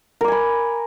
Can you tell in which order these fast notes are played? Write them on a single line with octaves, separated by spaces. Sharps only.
A#4 D6 G#5 B5